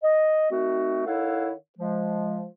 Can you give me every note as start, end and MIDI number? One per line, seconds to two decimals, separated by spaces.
0.03 0.47 75
0.51 1.05 51
0.51 1.05 57
0.51 1.05 60
0.51 1.05 63
0.51 1.05 66
1.06 1.52 51
1.06 1.52 64
1.06 1.52 69
1.06 1.52 73
1.06 1.52 77
1.06 1.52 78
1.79 2.46 53
1.79 2.46 56